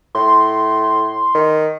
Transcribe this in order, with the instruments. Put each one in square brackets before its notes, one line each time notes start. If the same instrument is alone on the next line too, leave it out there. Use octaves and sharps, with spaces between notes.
[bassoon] A2 [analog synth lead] C6
[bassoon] D#3